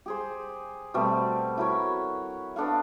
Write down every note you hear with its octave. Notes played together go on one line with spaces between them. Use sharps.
G4 G#4 C5
B2 G3 A3 C4
E4 F#4 A#4 C#5
B3 D4 A4 F5